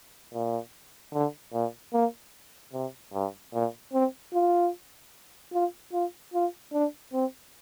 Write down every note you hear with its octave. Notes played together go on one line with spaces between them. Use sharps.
A#2
D3
A#2
A#3
C3
G2
A#2
C4
F4
F4
F4
F4
D4
C4